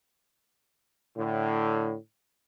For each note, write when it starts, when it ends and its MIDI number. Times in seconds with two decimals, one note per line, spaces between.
1.17 1.96 45
1.17 1.96 50